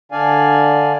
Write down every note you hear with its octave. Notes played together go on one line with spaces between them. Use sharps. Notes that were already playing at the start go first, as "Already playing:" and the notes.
D3 D4 D5 F5 G#5